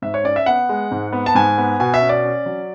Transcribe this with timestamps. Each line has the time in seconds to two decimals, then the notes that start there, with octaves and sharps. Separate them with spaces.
0.02 G#2 E5
0.14 C#5
0.24 C#4 D5
0.36 E5
0.46 B3 F#5
0.69 G#3
0.91 G#2
1.12 B3
1.26 A5
1.35 G#2 G#5
1.58 B3
1.80 B2 G#5
1.94 E5
2.01 C#4
2.09 D5
2.24 C#4
2.46 F#3